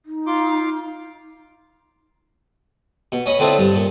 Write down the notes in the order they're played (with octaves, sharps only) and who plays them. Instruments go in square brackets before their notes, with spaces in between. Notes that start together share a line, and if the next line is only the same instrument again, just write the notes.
[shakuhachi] D#4
[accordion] F4 C6 D6
[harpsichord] B2
C#4 D#5 B5
D3 C4 D4 E4 F4 D#5
G2
A#2